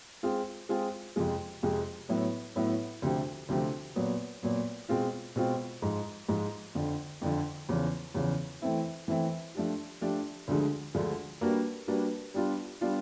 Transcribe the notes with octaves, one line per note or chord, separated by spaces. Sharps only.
G#3 C4 F4 G#4
G#3 C4 F4 G#4
F2 C3 F3 G#3
F2 C3 F3 G#3
A2 F#3 B3 E4
A2 F#3 B3 E4
D2 C3 F3 A3 C4
D2 C3 F3 A3 C4
A#2 F#3 B3
A#2 F#3 B3
B2 G#3 C4 F4
B2 G#3 C4 F4
G#2 F3 G#3
G#2 F3 G#3
F2 D3 F3
F2 D3 F3
E2 C#3 F3
E2 C#3 F3
E3 A3 C4 E4
E3 A3 C4 E4
F3 A3 D4 G4
F3 A3 D4 G4
D2 D3 F3 G#3
D2 D3 F3 G#3
G3 A#3 D4 F#4 B4
G3 A#3 D4 F#4 B4
G3 B3 D4 F4
G3 B3 D4 F4